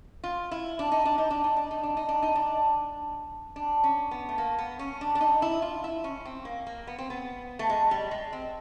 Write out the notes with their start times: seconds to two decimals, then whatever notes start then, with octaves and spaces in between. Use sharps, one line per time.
0.24 F4
0.51 E4
0.79 D4
0.92 D#4
1.06 D4
1.18 D#4
1.31 D4
1.44 D#4
1.57 D4
1.71 D#4
1.83 D4
1.97 D#4
2.09 D4
2.23 D#4
2.36 D4
3.56 D4
3.84 C#4
4.11 B3
4.29 A3
4.38 A#3
4.58 B3
4.79 C#4
5.01 D4
5.15 D4
5.21 D#4
5.42 E4
5.62 F4
5.84 E4
6.04 C#4
6.25 C4
6.45 A#3
6.67 A#3
6.87 B3
6.99 C4
7.10 B3
7.59 A3
7.70 G#3
7.91 G3
8.11 G#3
8.33 C4